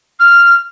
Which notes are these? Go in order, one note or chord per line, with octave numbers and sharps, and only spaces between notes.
F6